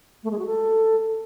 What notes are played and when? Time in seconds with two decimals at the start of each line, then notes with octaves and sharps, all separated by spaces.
0.24 A3
0.31 G#3
0.39 F#4
0.46 A4